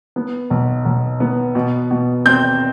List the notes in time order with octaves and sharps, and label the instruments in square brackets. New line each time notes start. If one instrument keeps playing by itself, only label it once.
[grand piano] B3
B1
B1
B3
B2
B2
C4 G6